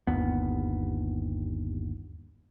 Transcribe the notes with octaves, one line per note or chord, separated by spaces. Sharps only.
G1 D#2 B3